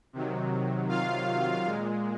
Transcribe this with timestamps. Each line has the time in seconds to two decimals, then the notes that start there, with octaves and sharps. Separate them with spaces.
0.13 C3 D#3 F#3
0.89 F4 F5
1.66 A#2 G#3